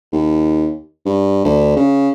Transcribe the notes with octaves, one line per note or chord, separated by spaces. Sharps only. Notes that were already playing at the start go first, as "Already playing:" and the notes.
D#2
G2
D2
C#3